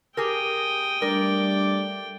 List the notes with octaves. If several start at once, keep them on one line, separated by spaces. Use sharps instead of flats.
G4 G#4 A#4 G5 D#6
G3 A3 D4 A#4 D5